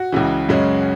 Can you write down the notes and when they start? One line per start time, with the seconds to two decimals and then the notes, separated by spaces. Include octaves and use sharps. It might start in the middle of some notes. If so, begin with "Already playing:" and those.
Already playing: F#4
0.12 C#2 C#3 E3
0.49 F#2 C#3 G#3 C#4